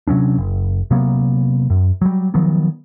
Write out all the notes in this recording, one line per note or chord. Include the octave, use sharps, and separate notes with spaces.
C3 F#3 C#4 D4
F#1
C3 F#3 A#3 B3
F#2
F#3 G3
D#3 F3 F#3 B3